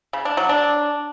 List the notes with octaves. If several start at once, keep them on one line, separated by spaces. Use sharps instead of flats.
C#3
D4
F#3
D4